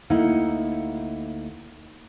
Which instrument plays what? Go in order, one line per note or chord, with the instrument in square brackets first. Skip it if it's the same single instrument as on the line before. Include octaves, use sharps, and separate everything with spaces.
[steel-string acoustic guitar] D2 A#3 D#4 E4 F#5